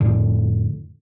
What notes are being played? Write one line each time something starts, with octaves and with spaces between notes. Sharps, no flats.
F2 A2 D3